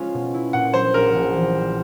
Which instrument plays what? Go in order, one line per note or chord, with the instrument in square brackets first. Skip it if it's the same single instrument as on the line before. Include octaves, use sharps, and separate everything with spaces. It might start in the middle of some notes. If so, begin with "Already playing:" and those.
Already playing: [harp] G#3 C#4 F4
B2
E4
[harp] A#2 [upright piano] F#5
[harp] F#3 [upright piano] C5
[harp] A#1 [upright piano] A#4
[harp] A#1
E3
G3